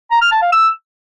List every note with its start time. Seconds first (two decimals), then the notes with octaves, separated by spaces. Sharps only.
0.11 A#5
0.21 F6
0.32 A5
0.42 F5
0.52 E6